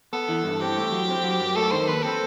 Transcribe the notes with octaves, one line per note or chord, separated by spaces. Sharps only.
B3 A4
E3
G2
C4 G4
A3
F#3
C4
F#3
F#2
A3 A4
D#3 C5
D#2 B4
C4 A4